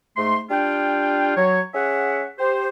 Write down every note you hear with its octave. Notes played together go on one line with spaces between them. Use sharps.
G#2 A3 C6
G3 D4 F4 G5
F#3 C#5
C#4 G#4 E5 F#5
G4 C5